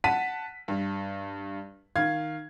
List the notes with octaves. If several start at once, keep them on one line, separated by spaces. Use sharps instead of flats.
F#5 A5 B6 D#7
G2
D#3 F5 G#6